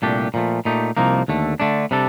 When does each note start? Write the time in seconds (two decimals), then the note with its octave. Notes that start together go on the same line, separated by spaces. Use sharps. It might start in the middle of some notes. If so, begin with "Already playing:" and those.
0.02 C2 A#2 A3 D4 G4
0.34 A#2 F3 A3
0.65 A#2 A3 D#4 G4
0.97 C2 C3 F3 A#3 D#4
1.28 D#2 D3 A3
1.60 D3 A3 D4
1.91 C3 G3 D4 A4